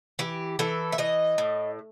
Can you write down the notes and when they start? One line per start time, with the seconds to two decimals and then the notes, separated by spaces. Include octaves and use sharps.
0.19 E3 G4
0.59 E3 A4
0.92 E5
0.98 E3 D#5
1.38 A2